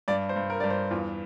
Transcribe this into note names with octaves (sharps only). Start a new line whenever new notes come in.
G2 D5
C5
G2
A#4
G2 D5
C5
E2 F4